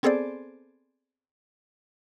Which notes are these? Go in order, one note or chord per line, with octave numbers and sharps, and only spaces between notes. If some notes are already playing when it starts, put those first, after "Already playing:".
B3 C4 G#4 A4 C5 D5